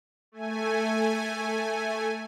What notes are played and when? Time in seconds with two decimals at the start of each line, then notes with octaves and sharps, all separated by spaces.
0.32 A3 G#5